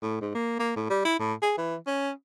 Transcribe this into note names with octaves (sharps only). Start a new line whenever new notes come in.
A2
G#2
A#3
A#3
A2
G3
E4
A2
G#4
E3
C#4